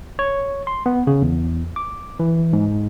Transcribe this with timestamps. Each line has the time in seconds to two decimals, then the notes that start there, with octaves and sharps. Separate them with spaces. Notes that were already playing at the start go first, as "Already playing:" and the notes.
0.19 C#5
0.67 C6
0.86 B3
1.07 C#3
1.22 E2
1.76 D6
2.19 E3
2.53 G#2